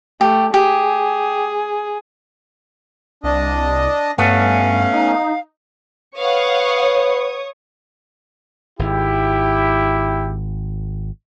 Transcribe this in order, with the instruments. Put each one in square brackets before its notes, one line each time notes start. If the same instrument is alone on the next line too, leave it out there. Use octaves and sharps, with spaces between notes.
[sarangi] A3 [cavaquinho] G4
[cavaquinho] G4 [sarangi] G#4
[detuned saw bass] C2 [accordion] D4 D#5
[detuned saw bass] G2 [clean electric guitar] A3 B3 [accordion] C#4 [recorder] F5
[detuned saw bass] D#4
[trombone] B4 [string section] C#5 C#6 D#6 [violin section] F5 F#5
[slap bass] G#1 [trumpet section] E4 G4